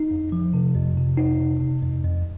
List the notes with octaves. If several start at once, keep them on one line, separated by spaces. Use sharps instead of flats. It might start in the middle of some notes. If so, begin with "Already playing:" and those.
Already playing: D#4
F2
F3
C3
F2
C3
F2 D#4
C3
C3
F2
F2